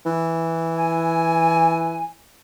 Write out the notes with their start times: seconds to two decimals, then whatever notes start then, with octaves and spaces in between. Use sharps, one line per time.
0.06 E3
0.75 G#5